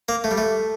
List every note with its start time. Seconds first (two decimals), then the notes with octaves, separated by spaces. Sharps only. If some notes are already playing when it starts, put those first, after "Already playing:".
0.09 A#3
0.24 A3
0.31 G3
0.38 A3